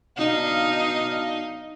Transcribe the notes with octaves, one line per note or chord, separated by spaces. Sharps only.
B2 D4 D#4 F5